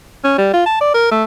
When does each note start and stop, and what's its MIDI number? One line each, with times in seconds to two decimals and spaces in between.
0.24 0.33 61
0.38 0.50 55
0.54 0.64 65
0.66 0.80 81
0.81 0.92 74
0.94 1.10 70
1.11 1.24 57